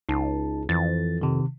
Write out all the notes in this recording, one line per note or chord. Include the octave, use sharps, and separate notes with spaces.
C#2 D#4 A5
F2 E3 A6
C3 D#3